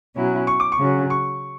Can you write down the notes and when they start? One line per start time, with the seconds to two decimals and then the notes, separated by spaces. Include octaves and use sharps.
0.16 B2 F#3 C#4 E4
0.47 C#6
0.60 D6
0.72 C#6
0.78 C#3 F#3 C#4
1.10 C#6